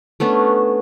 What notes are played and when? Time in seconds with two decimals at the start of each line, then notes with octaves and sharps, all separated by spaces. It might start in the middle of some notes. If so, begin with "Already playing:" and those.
0.20 A3 B3 C#4 D4